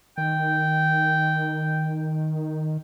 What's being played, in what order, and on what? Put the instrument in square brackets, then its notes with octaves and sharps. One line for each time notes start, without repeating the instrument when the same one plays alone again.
[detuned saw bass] D#3 [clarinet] G5